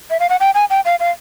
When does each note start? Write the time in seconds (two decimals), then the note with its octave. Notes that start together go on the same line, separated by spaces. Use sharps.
0.10 E5
0.20 F5
0.29 F#5
0.40 G5
0.54 G#5
0.70 G5
0.85 F5
1.00 F5